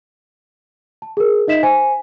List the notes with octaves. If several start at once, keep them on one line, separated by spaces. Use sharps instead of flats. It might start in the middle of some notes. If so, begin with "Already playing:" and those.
A5
G#4 A#4
D#4 D#5 E5 B6 E7
C5 G#5